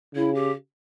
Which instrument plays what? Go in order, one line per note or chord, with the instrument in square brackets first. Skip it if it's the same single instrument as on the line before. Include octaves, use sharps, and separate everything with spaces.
[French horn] C#3 [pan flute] E4
[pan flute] G4